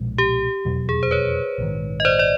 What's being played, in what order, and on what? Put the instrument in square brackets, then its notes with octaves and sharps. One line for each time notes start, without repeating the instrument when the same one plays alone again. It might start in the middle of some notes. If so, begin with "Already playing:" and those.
Already playing: [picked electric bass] B1 A#2 F3 G#3
[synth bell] G4
[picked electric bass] F1 E2 B2 F#3
[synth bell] G#4
C5
B4 C#5
[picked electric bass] A#1 G#2 D#3
[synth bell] D#5
C5 D5
D5